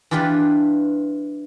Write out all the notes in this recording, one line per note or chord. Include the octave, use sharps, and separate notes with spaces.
E3 D4 F4 G4 B4